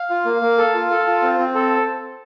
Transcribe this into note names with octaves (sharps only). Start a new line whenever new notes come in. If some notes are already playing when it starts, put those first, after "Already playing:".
Already playing: F5
F4
A#3
A#3
A4
F4
A4
F4
C4
C4
A4